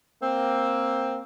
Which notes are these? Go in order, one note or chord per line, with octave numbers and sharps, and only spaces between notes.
A#3 C4